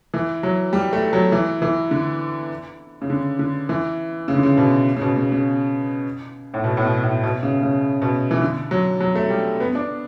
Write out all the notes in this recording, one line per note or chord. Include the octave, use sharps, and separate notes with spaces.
E3
F#3
G3
A3
F#3
E3
E3
D3
C#3
D3
D3
E3
C#3
D3
C#3
B2
C#3
B2
C#3
C#3
A2
B2
A2
B2
A2
B2
C#3
C#3
B2
E3
D3
F#3
F#3
A3
G3
B3
D4